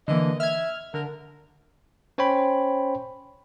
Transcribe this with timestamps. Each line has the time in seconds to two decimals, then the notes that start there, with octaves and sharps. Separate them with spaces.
0.08 D3 E3 A#3 D#5
0.40 E5 F6 G#6
0.94 D3 A#4
2.18 C#4 C5 C#5 G5 B5